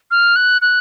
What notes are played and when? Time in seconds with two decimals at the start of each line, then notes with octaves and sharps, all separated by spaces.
0.11 F6
0.36 F#6
0.62 F#6